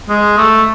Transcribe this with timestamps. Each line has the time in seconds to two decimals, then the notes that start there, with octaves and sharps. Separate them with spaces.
0.09 G#3
0.38 A3